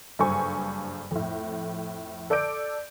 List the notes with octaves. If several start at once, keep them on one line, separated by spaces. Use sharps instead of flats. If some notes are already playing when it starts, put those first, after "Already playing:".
F#1 G2 A4 C5 G#5 C#6
F2 A2
A4 D5 D6 G6 D7